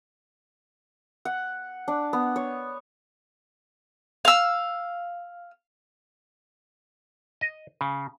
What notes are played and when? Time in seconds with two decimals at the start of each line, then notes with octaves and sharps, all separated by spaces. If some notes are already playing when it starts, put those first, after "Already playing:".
1.25 F#5
1.88 D4
2.13 B3
2.36 C#5
4.25 F5 E6
7.41 D#5
7.81 C#3